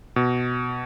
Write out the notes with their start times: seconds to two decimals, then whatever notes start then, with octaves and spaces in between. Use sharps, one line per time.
0.16 B2